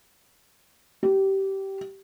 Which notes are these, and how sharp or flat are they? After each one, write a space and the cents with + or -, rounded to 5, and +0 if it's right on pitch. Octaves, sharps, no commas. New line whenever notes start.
G4 -20